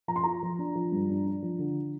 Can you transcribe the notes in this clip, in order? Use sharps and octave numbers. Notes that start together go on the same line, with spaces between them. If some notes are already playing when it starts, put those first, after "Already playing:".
F3 A#5
C6
F4 A#5
F3
D4
F3
G2
D4
D4
F3
D3